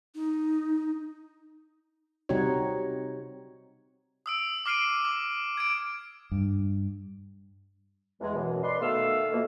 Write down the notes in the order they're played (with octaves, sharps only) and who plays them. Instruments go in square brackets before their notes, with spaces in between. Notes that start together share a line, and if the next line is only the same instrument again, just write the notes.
[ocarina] D#4
[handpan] C3 G3 C4 D#4 F#4 C#5
[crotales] D#6 E6 D7
D6 F6 C7 D7 D#7
D6
G#6 D7
[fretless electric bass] G2
[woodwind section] E2 G#3
F#2 B2 E3
B4 D5 D#5 C6
B2 D#3 A3 B3 F5 E6
B2 F3 A3 A#3